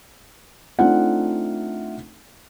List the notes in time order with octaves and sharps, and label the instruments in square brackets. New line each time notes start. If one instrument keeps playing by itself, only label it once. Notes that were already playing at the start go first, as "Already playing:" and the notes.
[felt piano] A3 C4 D4 D#4 F4 F#5